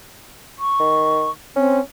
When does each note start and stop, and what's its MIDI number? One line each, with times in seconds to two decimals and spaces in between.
0.59 1.31 85
0.80 1.28 51
1.56 1.80 60
1.56 1.80 61